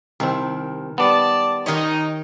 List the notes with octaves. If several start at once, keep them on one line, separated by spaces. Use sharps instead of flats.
C2 D#3 C4
G3 B3 D5 A5
D#3 D#4 G4 C#5